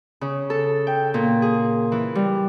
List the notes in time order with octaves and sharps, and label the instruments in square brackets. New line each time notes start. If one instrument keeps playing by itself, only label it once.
[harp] C#3
A4
G5
A#2
G#4
E3
G3